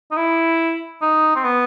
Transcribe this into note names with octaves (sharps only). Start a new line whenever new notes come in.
D#4
E4
D#4
C4
B3